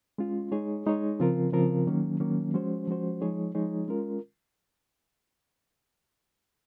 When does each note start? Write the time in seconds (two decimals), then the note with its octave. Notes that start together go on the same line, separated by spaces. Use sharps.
0.18 G#3 C#4 F4
0.52 G#3 D#4 G#4 C#5
0.86 G#3 D#4 G#4 C#5
1.20 C#3 F3 C4 F4 A#4
1.53 C#3 F3 C4 F4 A#4
1.87 D#3 F#3 A#3 C#4
2.20 D#3 F#3 A#3 C#4
2.54 F3 G#3 C#4 F#4 C5
2.87 F3 G#3 C#4 F#4 C5
3.21 F3 G#3 D#4 G#4 C#5
3.55 F3 G#3 D#4 G#4 C#5
3.88 G#3 C#4 F4 A#4